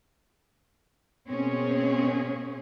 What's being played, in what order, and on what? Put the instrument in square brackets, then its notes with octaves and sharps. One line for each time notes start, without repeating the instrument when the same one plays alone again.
[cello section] B2 A#3 C4 C#4 G#4 C#5